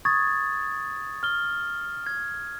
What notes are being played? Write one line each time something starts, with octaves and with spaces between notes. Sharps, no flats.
C#6 D#6 G#6 A6
F6 G7
G#6